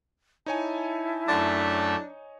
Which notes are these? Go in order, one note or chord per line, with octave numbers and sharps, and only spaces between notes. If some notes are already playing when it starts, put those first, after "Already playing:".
D#4 E4 C#5 G#5 A5
F#2 A3 D4 E5